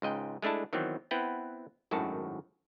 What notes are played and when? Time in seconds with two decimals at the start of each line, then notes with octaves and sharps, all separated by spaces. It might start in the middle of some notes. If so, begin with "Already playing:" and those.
0.02 C#2 G#2 D#5 G5
0.42 G#3 A3 D4 E4 A5
0.73 D#3 E3 F#3 B3 C4
1.11 B3 C4 E4 B4 F#5 G5
1.91 G#1 F#2 A2 D#3 F#4 A5